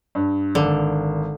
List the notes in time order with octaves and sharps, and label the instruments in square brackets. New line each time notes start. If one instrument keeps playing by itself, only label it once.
[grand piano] G2
[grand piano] G#1 [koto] D3